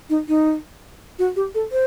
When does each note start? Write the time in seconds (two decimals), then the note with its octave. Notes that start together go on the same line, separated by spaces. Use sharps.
0.10 D#4
0.28 D#4
1.19 F#4
1.36 G4
1.55 A4
1.72 C5